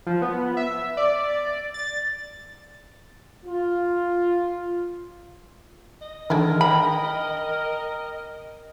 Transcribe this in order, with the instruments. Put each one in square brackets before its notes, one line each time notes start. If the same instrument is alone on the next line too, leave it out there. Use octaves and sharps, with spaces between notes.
[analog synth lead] F3
B3
E5
D5
A6
[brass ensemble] F4
[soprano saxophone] D#5
[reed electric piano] D#3 E3 D4 [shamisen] G#3 A3 E4 [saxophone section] A#4
[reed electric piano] G5 [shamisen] B5